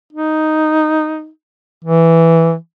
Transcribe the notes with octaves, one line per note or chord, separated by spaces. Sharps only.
D#4
E3